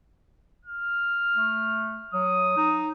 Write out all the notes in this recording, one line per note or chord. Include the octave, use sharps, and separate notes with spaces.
F6
A3
F#3 D#6
D#4